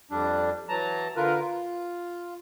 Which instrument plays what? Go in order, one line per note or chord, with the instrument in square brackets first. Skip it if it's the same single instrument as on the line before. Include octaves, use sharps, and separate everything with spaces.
[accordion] F2 G3 D4
E3 F#3 A5 A#5
D3 F4 A#4 B4
F4